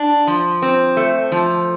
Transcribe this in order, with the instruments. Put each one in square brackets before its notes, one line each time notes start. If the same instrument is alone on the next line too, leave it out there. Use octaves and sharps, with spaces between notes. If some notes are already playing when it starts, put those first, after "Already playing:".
Already playing: [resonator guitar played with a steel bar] D4
F3
C4
A3
F3